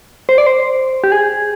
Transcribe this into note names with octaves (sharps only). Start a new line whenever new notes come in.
C5
D5
C5
G4
G#4